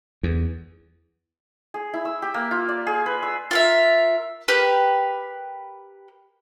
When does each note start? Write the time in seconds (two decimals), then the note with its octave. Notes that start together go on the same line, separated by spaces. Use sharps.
0.23 E2
1.74 G#4
1.94 E4
2.05 E6
2.22 G4
2.34 A#3
2.51 F4
2.69 D5
2.87 G#4
3.06 B4
3.23 E6
3.51 F4 A#4 E5
4.48 G4 A#4 B4